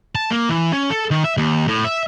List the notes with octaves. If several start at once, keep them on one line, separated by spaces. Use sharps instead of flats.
A5
A#3
E3
C#4
A4
D#3
E5
D#2
A2
E5